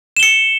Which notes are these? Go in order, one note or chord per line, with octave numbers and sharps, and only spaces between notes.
C#7 E7 G7